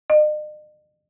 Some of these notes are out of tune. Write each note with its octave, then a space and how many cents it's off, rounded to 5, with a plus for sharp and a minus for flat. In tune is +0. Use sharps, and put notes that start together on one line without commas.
D#5 -45